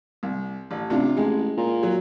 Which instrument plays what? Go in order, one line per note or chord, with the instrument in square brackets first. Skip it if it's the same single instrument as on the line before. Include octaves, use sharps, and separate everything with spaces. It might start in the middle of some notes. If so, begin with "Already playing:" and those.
[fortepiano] C2
A1
[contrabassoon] A1 [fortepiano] C3 D4 F4
[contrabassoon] A1 [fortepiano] G#3
[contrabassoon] A#2
[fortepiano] F#3